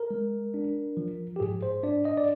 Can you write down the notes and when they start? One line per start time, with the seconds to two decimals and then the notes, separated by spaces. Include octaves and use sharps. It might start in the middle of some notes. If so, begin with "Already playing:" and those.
Already playing: A#4
0.11 G#3
0.54 D4
0.97 F3
1.36 G4
1.40 G#2 G#4
1.63 C5
1.83 D4 D5
2.05 D#5
2.17 D5